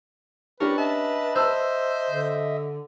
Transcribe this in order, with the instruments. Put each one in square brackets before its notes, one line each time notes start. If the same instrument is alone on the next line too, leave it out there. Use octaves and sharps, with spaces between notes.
[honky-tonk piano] C#4 D4 G4 [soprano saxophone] A#4 [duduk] B4 [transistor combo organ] A5 C#6
[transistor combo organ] D#5 E5 [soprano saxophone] A5
[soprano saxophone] C5 [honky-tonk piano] A5 E6
[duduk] D3